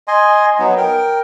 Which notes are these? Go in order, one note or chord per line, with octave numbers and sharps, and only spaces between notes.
D#5 G#5 C6
F#3 B3 D#4
A#4 G5